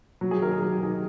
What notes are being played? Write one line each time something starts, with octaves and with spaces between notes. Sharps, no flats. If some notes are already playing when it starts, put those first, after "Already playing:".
F#3
G#4
D#3 A#4
G#4
F#3 G4
D#3 G#4